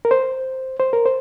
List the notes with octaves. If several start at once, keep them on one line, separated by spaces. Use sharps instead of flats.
A#4
C5
C5
A#4
C5